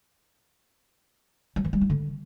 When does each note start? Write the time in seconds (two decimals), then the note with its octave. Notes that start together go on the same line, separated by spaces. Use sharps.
1.56 F#3
1.65 E3
1.73 G3
1.81 E4
1.90 D3